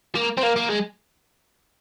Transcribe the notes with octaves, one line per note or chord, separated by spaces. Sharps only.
A#3
C4
A#3
A#3
G#3